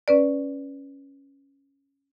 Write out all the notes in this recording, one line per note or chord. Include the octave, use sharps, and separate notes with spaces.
C#4 B4 D5